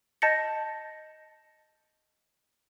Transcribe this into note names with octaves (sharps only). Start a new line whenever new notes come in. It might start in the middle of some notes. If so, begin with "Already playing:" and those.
D#5 A5 G6 A6 A#6 C#7